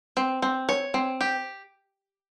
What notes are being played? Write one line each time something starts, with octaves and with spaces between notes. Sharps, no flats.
C4
C4
C#5
C4
G4